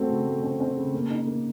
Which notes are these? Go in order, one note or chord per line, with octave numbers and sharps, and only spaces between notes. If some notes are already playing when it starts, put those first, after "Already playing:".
Already playing: A3 C4 F#4
C#3
A3
C4
C4
C#3
A#3
D#4
A#3